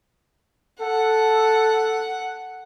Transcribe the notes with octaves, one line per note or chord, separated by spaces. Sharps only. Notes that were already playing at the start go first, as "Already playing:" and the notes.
A4 F#5